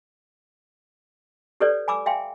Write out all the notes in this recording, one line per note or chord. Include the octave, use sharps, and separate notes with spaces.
G4 A4 B4 C#5 D5
G#5 B5 D6 E6
E5 F5 G5 G#5 C6